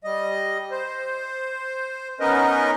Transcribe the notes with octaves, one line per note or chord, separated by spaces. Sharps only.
G3 D#5
C5
B3 C#4 D#4 A#4 B4 D#5